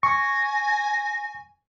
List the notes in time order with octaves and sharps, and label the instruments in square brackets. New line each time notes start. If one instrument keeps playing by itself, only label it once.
[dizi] G#5 [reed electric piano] C#6 [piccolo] A#6